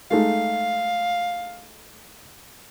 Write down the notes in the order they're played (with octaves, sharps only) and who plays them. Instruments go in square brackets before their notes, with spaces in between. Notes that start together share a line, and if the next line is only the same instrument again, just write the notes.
[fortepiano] G#3 A3 D#4 [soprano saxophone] F5